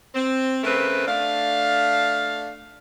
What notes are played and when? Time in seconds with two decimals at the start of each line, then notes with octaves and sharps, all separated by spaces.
0.15 C4
0.64 C#3 A3 C4 A#4 B4
1.07 A3 D4 F5